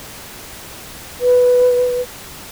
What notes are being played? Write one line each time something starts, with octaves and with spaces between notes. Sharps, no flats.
B4